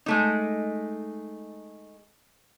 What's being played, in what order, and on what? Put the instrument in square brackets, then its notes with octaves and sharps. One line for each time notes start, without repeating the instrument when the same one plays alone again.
[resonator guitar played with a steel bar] G#3 A3 D#4